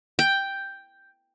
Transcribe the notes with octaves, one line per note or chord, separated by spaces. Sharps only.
G5